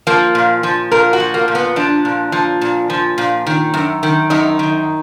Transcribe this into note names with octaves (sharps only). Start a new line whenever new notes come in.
F3 A#3
A#2
F3
A#2 A#4
F#4
F3
A#3
A#2
B3
F3 D4
A#2
F3
A#2
F3
A#2
D#3
F#2
D#3
F#2 D#4
D#3